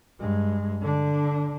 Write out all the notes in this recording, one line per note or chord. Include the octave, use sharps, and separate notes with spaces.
G2 G#3
D3 D4